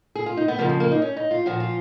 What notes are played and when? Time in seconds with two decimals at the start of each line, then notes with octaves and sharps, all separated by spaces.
0.15 G#4
0.26 F4
0.37 D#4
0.48 B3
0.58 F2 C#3 F3 A#3
0.69 A#3
0.80 A#3
0.92 D#4
1.02 C#4
1.17 D#4
1.31 F4
1.45 A#2 F3 F#4
1.60 F4